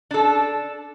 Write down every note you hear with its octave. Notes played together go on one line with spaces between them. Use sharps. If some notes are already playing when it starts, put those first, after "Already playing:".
D4 A4